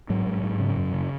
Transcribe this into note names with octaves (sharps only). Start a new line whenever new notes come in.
G#2 F#3
G#2
G#2
C#3
F#2
C#3